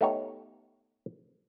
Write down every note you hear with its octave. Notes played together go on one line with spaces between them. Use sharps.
A3 B3 D#4 G4 C#5